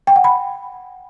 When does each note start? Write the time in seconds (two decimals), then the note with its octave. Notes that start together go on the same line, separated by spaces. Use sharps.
0.07 G5
0.16 F#5
0.24 B5